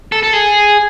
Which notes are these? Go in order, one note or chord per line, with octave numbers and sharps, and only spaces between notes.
A4
A4
G#4